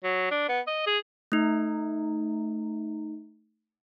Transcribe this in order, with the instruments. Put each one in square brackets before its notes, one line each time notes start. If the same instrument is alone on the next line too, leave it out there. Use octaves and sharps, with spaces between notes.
[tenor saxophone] F#3
D4
B3
D#5
G#4
[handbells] A3 D#4